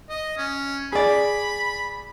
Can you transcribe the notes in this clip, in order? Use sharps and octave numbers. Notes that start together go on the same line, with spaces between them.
D#5
C#4
G#4 D5 B5